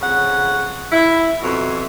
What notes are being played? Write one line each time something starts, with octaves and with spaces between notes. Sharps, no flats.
F2 C#3 F#5
E4
F2 B2 E4